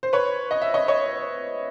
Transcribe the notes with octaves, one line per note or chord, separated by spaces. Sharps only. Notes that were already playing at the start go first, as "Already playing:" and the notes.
C5
B4 C#5
D#5
E5
C#5 D#5
C#5 D#5